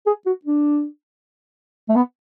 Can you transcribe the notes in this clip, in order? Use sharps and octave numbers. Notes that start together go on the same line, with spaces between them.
G#4
F#4
D4
A3
B3